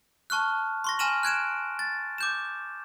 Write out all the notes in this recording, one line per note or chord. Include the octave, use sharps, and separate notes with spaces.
A5 C#6 F6 F#6
C6 C#6 A#6
G#5 F6 A#6 D#7 E7 F#7
F#6 G#6 D7 E7
A6
D6 G6 E7